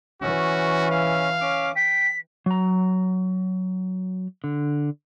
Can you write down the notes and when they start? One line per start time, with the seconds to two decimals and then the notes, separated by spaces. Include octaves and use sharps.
0.22 E3 C#4 F#4
0.91 F5
1.41 C#4 D6
1.76 G5 B6
2.46 F#3 A#5
4.44 D3